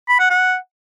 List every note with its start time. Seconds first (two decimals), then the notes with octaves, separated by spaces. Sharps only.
0.09 B5
0.19 F#5
0.30 F#5